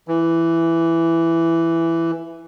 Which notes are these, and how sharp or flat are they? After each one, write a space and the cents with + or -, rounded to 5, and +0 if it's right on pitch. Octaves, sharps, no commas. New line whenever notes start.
E3 +10